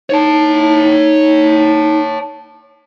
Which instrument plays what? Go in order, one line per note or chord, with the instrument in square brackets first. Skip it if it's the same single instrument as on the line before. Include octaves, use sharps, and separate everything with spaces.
[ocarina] D#4 [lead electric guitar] C#5 A5